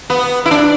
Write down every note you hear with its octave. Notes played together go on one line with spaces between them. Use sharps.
B3
E4
D4